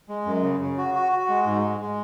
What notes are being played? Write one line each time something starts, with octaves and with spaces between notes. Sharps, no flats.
G#3
F#2
C#3
C#3
F#4
F#4
F#4
G#3
G#2
G#3
G#3